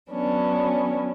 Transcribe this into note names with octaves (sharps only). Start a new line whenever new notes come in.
F#3 B3 C#4 D4